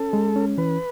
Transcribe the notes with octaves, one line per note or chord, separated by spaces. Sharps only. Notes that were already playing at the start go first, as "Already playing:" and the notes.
Already playing: C#4 A4
G#3
C#4
E3 B4